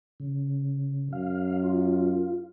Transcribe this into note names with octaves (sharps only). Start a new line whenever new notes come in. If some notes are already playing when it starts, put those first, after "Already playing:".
C#3
F#2 F5
F4